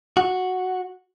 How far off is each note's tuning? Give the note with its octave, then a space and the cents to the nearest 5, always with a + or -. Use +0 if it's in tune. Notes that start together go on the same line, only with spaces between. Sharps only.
F#4 -5